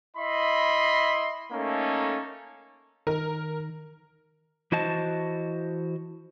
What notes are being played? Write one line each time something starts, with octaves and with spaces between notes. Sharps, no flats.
E4 D#5 E5 B5 C6
A3 A#3 C#4 D#4 A4
D#3 A#4
E3 E4 F#4 C5 D#5 A5